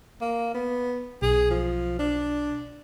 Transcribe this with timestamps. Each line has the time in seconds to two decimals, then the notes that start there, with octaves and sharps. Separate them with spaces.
0.21 A#3
0.54 B3
1.22 B1 G#4
1.50 F3
1.99 D4